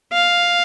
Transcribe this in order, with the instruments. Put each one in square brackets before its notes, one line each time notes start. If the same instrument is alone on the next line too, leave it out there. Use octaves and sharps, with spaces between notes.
[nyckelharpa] F5